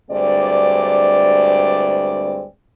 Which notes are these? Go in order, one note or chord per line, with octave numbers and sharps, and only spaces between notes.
D2 G2 G#3 C4 D5